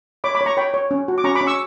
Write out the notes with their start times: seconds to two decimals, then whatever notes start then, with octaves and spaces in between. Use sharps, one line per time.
0.24 C#5 B5 D6
0.34 B5 D6
0.41 C#5
0.46 A#5 C#6
0.57 C#5 G5 B5
0.74 C#5
0.91 C#4
1.08 F#4
1.18 D6
1.24 C#4 A#5 C#6
1.35 B5 D6
1.41 C#4
1.47 C#6 E6